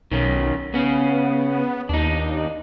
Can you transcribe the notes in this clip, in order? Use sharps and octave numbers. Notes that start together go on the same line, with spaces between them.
B1 D#3 C#4
C#3 B3 C#4
D#2 D4 D#4